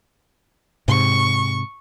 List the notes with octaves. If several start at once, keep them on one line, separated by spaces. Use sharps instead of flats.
G#2 C3 C#6